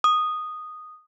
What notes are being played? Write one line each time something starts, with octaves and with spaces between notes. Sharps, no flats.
D#6